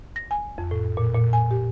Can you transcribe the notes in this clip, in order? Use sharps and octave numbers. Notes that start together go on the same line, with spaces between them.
A#6
G#5
F2
A2
A#2
A#2
G#5
G4